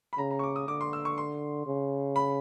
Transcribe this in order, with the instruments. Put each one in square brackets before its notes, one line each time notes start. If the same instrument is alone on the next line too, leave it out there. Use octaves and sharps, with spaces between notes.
[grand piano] B5
[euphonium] C#3 [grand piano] A#5
[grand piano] A#5
C#6
D6
D#6
[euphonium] D3 [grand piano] D6
[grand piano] C6
E6
C#6
C6
[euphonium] C#3
[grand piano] B5